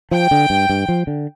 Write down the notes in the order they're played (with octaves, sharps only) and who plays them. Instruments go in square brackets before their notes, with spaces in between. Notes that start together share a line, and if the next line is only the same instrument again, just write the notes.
[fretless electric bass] F3 [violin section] G5
[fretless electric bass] D3
G2
G2
F3
D3